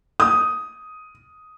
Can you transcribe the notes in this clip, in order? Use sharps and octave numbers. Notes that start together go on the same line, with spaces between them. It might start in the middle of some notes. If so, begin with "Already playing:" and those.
D#6